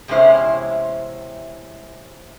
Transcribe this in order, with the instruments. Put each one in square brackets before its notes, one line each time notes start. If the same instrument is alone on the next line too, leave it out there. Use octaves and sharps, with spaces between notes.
[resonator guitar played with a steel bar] E2 C3 G#3 C#4 E4 C5